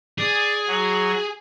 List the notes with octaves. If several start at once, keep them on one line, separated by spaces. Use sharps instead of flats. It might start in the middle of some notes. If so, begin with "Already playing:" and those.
G#4 D5
F#3